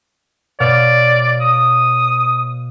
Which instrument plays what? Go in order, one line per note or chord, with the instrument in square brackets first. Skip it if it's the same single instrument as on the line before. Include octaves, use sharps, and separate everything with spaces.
[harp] B2 C#5 F5 [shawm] D5
[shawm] D#6